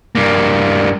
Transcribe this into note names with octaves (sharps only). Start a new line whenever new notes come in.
G2 A#3